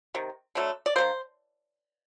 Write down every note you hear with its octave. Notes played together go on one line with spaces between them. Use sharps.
C3 D#3
D3 F#3 A3
D5
D#3 G3 A#3 C5